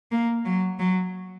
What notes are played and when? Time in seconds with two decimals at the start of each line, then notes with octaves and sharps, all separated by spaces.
0.12 A#3
0.45 F#3
0.79 F#3